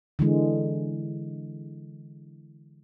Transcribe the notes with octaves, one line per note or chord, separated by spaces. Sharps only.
D3 E3 G#3